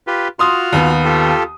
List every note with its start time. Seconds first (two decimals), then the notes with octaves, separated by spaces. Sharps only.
0.07 F4 G4 B4
0.39 F4 F#4 C6 D#6 F6
0.73 D#2 B3
1.05 F4 G4 A4